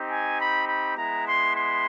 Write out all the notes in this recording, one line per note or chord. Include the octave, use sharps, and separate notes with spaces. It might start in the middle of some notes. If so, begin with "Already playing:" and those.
Already playing: C4 D#4 G4
G#5
B5
B5
G#3 B3 E4 A#5
C6
C6